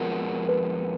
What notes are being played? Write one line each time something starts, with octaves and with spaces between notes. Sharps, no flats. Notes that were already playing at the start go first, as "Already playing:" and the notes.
Already playing: F2 F3 G#3 B3 F#4 A#4
B4